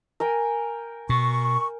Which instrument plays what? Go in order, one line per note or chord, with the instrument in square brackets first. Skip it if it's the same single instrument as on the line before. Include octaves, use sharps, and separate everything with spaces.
[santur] A#4 G5 G#5
[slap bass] B2 [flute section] C#6